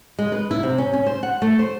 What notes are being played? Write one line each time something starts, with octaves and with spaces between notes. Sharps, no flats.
G#3
B4
E4
C3
C#4
C#4
C5
F#5
A3
C5